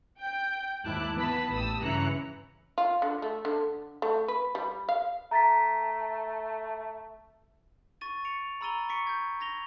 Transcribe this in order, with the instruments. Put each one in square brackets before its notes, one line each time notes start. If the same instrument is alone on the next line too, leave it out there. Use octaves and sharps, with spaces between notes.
[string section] G5 G6
D#2 G#2 E4 A5 D6 F#6
E3 B3 B4 A5 B5
A1 G4 A5 D#6 E6
G2 C#3 E3 A#5 F#6 C#7
[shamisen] F4
D3
A3
D3
A3
B4
G3
F5
[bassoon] A3 [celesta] A#5 A6 B6
[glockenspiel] C#6 A6 D#7
C#7 D7 F7
A#5 B5 E6 A6 D#7 G7
C#6 B6 C#7 D7
G6 G#6
G#6 A#6 F7 G7